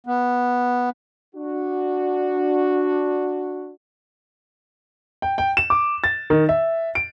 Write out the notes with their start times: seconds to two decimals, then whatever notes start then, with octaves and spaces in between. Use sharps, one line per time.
0.07 B3
1.35 D4 F#4
5.22 G5
5.38 G5
5.57 E7
5.70 D6
6.04 A6
6.30 D#3
6.49 E5
6.95 D7